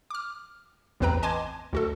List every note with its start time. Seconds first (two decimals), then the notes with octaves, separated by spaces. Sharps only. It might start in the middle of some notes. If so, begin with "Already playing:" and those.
0.10 D6 F6
1.00 A1 E2 C4 B4 G5 A#5
1.23 D#5 G#5 A5 C6 D6 G#6
1.73 D2 F#4 A4